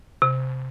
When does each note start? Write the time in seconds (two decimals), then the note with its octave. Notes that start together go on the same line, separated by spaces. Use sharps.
0.22 C3